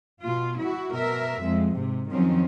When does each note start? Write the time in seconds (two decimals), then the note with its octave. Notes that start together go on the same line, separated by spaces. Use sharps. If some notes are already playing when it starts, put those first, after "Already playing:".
0.22 B2 F4
0.59 E4 F#4
0.94 B2 A#4 E5
1.43 F2 G#3
1.76 G#2 C3
2.10 F2 D#3 F3 F#3 C4 C#4